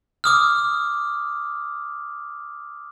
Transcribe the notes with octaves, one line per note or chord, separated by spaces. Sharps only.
D6 D#6 F6